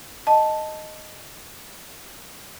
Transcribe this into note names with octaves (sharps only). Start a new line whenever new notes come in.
D#5 A5